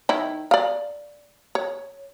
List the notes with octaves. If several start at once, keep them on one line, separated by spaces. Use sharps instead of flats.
D#3 E4
D5 F5
C#5